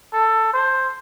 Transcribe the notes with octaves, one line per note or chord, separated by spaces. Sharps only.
A4
C5